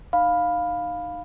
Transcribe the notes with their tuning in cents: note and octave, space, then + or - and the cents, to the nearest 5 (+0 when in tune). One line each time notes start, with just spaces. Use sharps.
D#4 -15 F5 +10 B5 +0